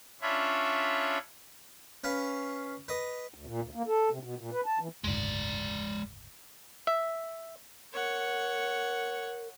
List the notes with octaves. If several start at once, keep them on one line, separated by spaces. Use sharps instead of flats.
C#4 D4 F4 C#5 E5 B5
C#4 B4 F5
B4 D#5
D2
A#2
D2
A#3
A4
C3
B2
A#2
B4
A5
E3
F#1 D2 G#2 G#3 D5
E5
A#4 C#5 F#5